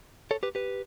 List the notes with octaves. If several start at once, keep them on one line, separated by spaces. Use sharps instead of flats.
A4 C#5
G4 B4
G4 B4